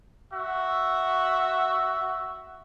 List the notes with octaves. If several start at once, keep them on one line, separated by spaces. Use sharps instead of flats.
F#4 E5